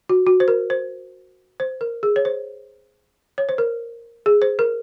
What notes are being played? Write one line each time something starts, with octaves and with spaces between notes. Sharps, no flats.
F#4
F#4
C5
A#4
C5
C5
A#4
G#4
C#5
C5
C#5
C5
A#4
G#4
C5
A#4